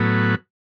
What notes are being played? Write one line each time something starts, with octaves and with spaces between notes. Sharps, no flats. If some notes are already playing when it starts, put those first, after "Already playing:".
Already playing: A2 F#3 B3